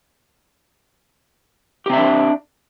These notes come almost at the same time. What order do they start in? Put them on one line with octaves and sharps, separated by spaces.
G4 C4 E5 D4